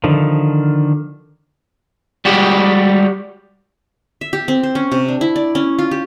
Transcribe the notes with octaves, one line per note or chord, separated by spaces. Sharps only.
D3 D#3 F3
G3 G#3 F#4 G4
E5
G4
C4
C5
C#4
C3
D4
E4
D5
C#4
F4
G4